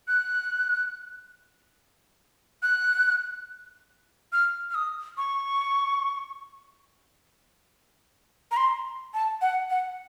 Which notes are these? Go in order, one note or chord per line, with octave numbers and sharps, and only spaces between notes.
F#6
F#6
F6
F6
D#6
C#6
A#5
C6
A5
F#5
F#5